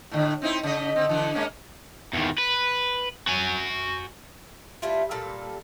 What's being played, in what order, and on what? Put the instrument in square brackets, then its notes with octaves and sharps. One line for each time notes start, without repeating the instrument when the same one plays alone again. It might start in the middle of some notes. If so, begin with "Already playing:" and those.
[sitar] A2 D3
C4 D#4 E4
C#3 D#5
D3 C4
D3 E3
G#3 A#3 C#4
[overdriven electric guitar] E2 D#3
B4
F#4 G#5
[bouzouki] G3 A3 E4 F4
A#2 G3 A4 F5